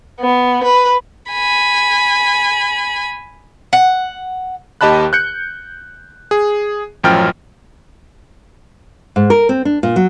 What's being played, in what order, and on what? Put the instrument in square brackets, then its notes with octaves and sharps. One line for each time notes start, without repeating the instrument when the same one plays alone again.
[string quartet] B3
B4
[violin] G#5 B5
[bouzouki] F#5
[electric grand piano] D#2 G4 D#5 A5 B5 F#6
F#6 G6 C#7
G#4
A1 F#2 F3 G5 F6
[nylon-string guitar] G#2
A#4
C4
D4
A#2
F#3